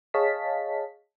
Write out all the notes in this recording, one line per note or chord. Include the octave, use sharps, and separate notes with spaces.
G#4 C#5 D#5 F5 A5 B6